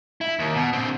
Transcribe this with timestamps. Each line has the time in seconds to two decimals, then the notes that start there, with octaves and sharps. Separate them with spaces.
0.21 E4
0.39 D#2
0.55 B2
0.73 D3 C4